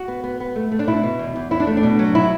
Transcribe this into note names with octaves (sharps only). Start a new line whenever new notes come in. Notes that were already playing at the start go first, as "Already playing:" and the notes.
Already playing: F#4
B3
B3
B3
A3
A3
D4
B2 E4
B2
E2
E2
E2 E4
D4
A3
D4
B2
F#3
B2 E4